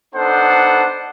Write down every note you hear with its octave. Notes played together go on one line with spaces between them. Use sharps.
B3 D4 D#4 A4 C5 F#5